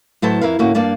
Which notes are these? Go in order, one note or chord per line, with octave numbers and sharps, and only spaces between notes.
A2 F#3 A4 B4 C5 A5
F2 E4 A#4 B4 F5
D2 A2 A#3 C#4 F#4
G2 A#3 D4 D5 A5